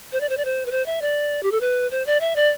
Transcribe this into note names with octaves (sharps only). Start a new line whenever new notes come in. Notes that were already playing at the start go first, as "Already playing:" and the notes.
C5
D5
C5
D5
C5
B4
C5
E5
D5
G4
A4
B4
C5
D5
E5
D5